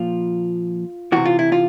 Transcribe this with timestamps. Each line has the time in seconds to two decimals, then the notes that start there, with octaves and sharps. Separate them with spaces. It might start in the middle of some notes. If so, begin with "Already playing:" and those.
Already playing: A#2 F3 F4
1.12 C3 E3 F#4
1.25 F4
1.39 E4
1.52 F4